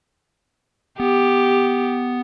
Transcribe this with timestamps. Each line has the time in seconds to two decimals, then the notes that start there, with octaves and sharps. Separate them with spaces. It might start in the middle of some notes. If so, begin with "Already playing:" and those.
1.00 B3 G4